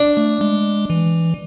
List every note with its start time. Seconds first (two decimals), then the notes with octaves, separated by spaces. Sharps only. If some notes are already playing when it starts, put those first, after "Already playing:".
Already playing: D4
0.17 A3
0.41 G#3
0.90 E3